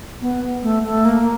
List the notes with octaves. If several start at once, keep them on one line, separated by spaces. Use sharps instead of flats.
B3
A3
A3
A#3